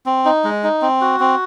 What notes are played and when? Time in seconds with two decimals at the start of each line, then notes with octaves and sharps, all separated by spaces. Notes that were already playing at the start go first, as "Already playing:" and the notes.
0.06 C4
0.25 D#4
0.44 G#3
0.63 D#4
0.82 C4
1.01 F#4
1.20 C4